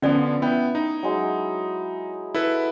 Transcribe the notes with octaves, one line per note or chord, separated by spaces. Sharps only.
D3 F3 B3 C#4 D5 G#5
B3 E4 G5
D#4 B5
F#3 G#3
E4 A4 B4